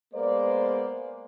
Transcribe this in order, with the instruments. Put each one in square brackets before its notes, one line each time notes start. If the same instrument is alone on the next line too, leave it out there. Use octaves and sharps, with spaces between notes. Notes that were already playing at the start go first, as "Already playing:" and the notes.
[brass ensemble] G#3 A#3 B3 B4 C5 D5